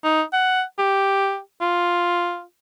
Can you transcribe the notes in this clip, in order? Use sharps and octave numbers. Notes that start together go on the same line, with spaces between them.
D#4
F#5
G4
F4